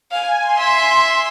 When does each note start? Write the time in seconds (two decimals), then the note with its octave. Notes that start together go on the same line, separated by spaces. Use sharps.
0.11 F5 G#5
0.42 C6
0.58 E5
0.73 C6